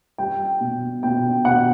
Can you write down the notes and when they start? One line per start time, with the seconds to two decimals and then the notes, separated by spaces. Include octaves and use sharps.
0.18 G3 G5
0.61 B2
1.03 B2 G5
1.45 B2 F#5